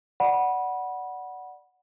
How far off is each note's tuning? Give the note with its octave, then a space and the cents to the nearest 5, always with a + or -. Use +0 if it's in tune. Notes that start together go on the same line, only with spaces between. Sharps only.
D5 +0 F#5 +0 B5 -25